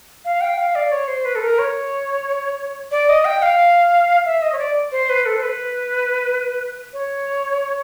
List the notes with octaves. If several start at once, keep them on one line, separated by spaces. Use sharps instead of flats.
F5
G5
F5
D5
C#5
C5
B4
A4
A#4
C#5
D5
D#5
G5
F5
E5
D#5
C#5
D5
C5
B4
A4
C5
B4
C#5